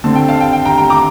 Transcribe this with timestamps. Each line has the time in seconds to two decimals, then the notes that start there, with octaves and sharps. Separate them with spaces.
0.04 D3 A3 C4 A5
0.15 G5
0.28 F5 A5
0.41 G5
0.53 G5
0.65 G5 A#5
0.78 G5 A#5
0.90 A#5 D6